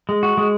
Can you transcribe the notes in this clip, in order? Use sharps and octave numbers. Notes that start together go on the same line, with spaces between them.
G#3
F#4
G#3